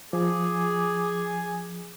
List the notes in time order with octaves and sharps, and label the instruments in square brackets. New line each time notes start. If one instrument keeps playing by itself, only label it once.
[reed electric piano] F3 [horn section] G#4 [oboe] D6